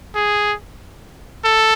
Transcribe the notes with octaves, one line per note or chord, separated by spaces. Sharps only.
G#4
A4